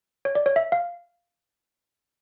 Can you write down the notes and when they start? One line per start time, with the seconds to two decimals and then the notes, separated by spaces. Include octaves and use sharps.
0.25 C#5
0.35 D5
0.46 C#5
0.56 E5
0.72 F5